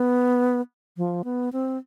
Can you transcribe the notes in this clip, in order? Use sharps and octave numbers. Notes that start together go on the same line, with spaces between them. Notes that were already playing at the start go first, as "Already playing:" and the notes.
Already playing: B3
F3
B3
C4